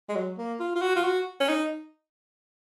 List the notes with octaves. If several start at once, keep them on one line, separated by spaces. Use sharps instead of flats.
G#3
F#3
A#3
F4
F4
F#4
F4
F#4
C#4
D#4